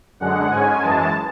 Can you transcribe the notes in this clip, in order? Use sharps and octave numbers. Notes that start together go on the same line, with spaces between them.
F#2 D3 G#3 F#5
G#2 G#3 C#4 G#5
F#2 E3 G#3 A5